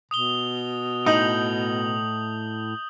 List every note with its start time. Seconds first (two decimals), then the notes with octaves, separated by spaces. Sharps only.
0.11 B2 D#6 F7 G7
1.06 A2 D#4 D#6 G6 F#7